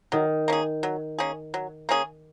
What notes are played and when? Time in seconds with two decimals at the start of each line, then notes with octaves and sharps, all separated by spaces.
0.12 D#3 F#3
0.48 A#3 C#4 G#4
0.83 F#3
1.19 A#3 C#4 G#4
1.54 F#3
1.89 A#3 C#4 G#4